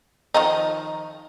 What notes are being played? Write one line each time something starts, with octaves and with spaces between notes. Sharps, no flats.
D#3 F3 D#4